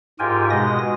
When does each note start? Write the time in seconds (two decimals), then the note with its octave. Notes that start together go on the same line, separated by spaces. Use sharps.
0.19 G#2 F4 G4 A#4 G5 G#5
0.50 B2 G#3 D#5 D#6 A#6